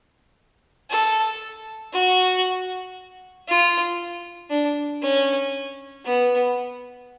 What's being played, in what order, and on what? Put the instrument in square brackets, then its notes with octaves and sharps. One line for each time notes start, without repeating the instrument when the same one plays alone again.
[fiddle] A4
F#4
F4
D4
C#4
B3